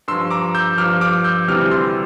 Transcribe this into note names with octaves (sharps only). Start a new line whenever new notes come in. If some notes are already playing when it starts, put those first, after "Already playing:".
G2 F3 C6 E6
A#5 D6
E6 G6
G2 F3 D6 F6
D6 F6
E6 G6
D2 C3 E3 G3 D6 F6
C6 E6